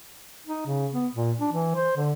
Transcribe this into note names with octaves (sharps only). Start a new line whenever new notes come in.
D#4
C#3
B3
A#2
D4
E3
C5
D3